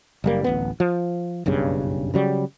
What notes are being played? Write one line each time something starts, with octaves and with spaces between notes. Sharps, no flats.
F#1 G3 A#3
D1 A1 B3
F3
F#1 B1 G2 C#3
C#3 F#3 G3